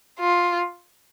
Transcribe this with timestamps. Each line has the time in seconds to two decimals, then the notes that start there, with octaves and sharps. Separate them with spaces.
0.20 F4